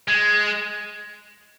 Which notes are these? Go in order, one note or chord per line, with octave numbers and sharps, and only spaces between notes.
G#3